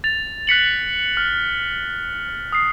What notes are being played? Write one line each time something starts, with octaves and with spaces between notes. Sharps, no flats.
A6 F7
F#6 B6 C#7 F#7
F6
D#6 C7